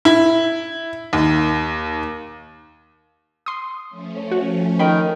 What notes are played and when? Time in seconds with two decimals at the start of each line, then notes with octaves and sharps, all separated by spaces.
0.05 E4
1.13 D#2
3.46 C6 D#6
3.89 F3 A3 C#4
4.31 F#4
4.79 D#3 G5 B5